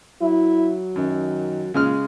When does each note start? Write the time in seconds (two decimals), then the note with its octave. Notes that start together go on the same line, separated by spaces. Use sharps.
0.22 F#3 E4
0.96 F#2 D#3
1.74 A#2 C#3 G#3 F6